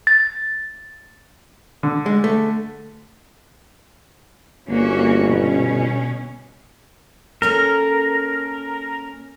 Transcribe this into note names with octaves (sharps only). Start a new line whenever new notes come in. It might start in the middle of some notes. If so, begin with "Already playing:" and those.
A6
D3
G#3
A3
G1 A#3 C#4 F#4
B2 C#4
A#3 C#4 A4 A#4